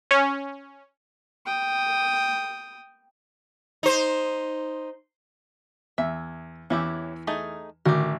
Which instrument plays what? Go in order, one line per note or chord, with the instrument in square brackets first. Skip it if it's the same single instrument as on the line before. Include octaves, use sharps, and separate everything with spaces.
[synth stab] C#4
[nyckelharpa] G5 D#6
[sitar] D#4 C5
[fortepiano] E2 [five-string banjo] E5
[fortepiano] E2 E3 [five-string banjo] C#4 E4 G4
[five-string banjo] A3 D#4 G#4
[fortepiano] A1 [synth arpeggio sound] D3 D#3 F#4 [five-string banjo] G4 A#4